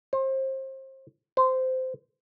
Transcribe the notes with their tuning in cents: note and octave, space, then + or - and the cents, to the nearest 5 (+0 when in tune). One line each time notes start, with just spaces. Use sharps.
C5 +30
C5 -15